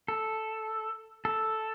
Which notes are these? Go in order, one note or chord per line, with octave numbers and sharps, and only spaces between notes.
A4
A4